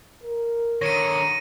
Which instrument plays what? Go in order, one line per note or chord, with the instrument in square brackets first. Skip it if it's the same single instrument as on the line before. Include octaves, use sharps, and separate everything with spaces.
[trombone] A#4
[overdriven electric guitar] D3 D#3 [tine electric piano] C#5 [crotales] A#6 C#7 D#7